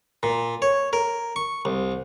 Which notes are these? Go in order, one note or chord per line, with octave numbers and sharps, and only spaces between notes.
A#2
C#5
A#4
C#6
C2